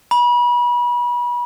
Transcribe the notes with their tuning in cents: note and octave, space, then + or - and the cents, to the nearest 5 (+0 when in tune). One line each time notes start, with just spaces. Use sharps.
B5 -35